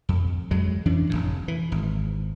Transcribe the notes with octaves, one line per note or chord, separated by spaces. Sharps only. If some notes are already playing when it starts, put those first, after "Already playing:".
F2
F2 F#3 G#3
F2 E3 C#4 D4
F1 C2 A2
E3
G#1